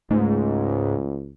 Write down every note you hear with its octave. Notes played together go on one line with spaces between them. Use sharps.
C#2 G#2 A3